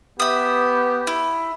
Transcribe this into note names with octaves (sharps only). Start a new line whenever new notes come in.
B3 G4 E5 D#6
E4